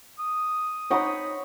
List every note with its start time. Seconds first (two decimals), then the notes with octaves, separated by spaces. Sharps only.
0.19 D#6
0.90 C4 D#4 C#5 F#5 B5